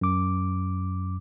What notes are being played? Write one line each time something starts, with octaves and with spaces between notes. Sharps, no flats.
F#2 D6